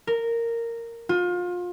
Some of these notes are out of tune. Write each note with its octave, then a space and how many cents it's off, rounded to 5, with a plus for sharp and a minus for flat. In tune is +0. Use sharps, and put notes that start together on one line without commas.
A#4 -10
F4 +30